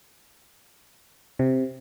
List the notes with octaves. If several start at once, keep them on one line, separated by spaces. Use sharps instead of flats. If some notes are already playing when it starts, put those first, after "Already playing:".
C3